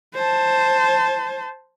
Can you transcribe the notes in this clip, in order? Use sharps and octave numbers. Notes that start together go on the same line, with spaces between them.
C5 A5